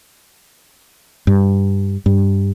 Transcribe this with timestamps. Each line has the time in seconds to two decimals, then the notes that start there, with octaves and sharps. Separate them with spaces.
1.27 G2
2.06 G2